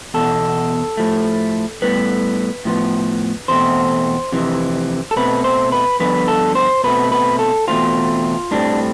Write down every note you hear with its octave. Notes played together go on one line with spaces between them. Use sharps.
E2 B2 A4
A2 F3 A3
A2 G3 B3 B4
A2 F3 B3
E2 B2 A3 C4 C5
F2 C3 E3
A4
B2 A3 C4 B4
C5
B4
G2 D3 F3 B3 B4
A4
C5
B2 A3 C4 B4
B4
A4
E2 B2 A3 C4 F4
A2 G3 C4 D4